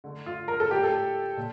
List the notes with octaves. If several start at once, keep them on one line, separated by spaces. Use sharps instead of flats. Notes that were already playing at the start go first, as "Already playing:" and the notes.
D3 A3
F4
A#4
A4
A2 G3 G4
A4
A#2